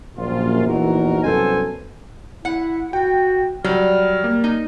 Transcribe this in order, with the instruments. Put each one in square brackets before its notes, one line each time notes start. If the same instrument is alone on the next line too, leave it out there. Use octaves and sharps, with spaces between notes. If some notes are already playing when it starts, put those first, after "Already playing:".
[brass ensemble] A#1 F#2 F4
A#1 E2 D#4 F#4 A#4
C2 F#2 B3 A4 C5 G#5
[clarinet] E4 [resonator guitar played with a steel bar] F#5
[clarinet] F#4 [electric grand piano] G5
[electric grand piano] F#3 [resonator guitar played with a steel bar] G3 [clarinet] F6
[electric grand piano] A#3
[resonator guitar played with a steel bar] D#4